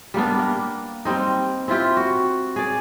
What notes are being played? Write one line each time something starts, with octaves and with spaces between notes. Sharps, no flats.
G3 A#3 B3 D4
A#3
G3 C4 D#4
C4 E4 F4 G4
F#4
G#4 D5